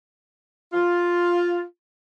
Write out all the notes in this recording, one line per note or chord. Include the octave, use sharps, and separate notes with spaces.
F4